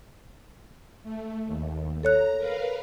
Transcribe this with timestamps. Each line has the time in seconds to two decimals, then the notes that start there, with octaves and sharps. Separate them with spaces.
1.03 A3
1.47 D#2
2.03 A4 C#5 A#5 F#6
2.37 A#4 B4 F5